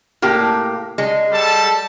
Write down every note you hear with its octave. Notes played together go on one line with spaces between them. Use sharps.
A2 A#3 G4
G#3
G3 A4 A5